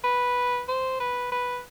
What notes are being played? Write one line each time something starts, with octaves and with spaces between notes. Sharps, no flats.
B4
C5
B4
B4